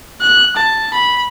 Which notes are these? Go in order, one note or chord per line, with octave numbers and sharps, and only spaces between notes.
F#6
A5
B5